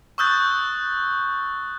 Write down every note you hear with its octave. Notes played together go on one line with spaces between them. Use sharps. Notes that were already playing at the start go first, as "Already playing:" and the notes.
C#6 D#6 E6 F#6 G6 A6